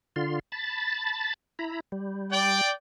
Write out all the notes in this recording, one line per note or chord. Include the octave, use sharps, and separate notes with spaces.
D3 F4 C6
A5 B5 A6
E4 A#5 B5
G3
D5 G5